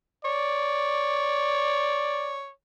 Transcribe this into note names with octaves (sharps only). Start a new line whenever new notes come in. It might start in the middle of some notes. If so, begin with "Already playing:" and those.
C#5 D5